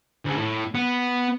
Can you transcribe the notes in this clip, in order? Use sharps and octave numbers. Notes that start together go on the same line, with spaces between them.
D2 C#3
A2
B3